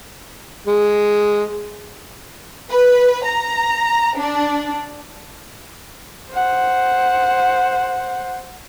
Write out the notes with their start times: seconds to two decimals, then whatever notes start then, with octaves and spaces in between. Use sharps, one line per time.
0.67 G#3
2.70 B4
3.25 A#5
4.18 D4
6.32 C5 F#5